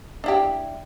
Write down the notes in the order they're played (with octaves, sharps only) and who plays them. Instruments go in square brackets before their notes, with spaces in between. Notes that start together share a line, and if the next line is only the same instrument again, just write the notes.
[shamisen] D4 E4 G4